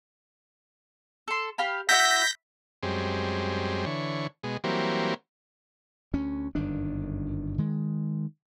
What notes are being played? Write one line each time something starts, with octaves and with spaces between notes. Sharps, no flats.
A4 C6
G4 F5 B5
E4 F#4 E5 G6 A#6 B6
F#2 G3 G#3 C4
D3 E3 C#5
B2 G#3
E3 F#3 G3 A#3 C4
D2 C#4
G1 F#2 D#3 D4
D#3 G#3